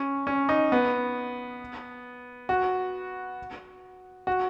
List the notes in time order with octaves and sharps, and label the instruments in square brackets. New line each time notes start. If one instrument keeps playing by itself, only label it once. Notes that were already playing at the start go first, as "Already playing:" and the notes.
Already playing: [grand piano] C#4
C#4
D#4
B3
F#4
F#4